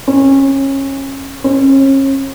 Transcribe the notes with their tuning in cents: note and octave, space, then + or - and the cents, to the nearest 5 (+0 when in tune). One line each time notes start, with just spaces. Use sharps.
C#4 -25
C#4 -35